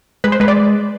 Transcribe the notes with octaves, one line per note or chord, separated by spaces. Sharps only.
G#3 B4
C5
G#3 B4
D5